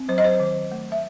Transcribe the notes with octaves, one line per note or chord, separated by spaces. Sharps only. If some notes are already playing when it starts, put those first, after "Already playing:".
Already playing: C4
F#3 C5
D#5
C5
D#3
A3
E5